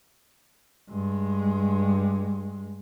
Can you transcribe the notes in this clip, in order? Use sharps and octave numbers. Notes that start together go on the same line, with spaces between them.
G2 G#3